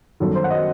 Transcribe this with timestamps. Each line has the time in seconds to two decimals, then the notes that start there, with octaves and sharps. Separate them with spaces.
0.20 G1 F#2 D#3 A4
0.35 C5
0.44 F#5
0.50 D#5